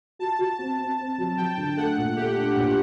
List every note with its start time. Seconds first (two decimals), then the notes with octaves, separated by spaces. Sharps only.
0.19 F#4 A5
0.39 F#4
0.59 C4 A5
0.78 C4
0.98 C4
1.18 F#3
1.37 F#3 G5
1.57 D3
1.77 A3 F#5
1.97 A#2
2.17 A3 G4
2.36 D4
2.56 A#2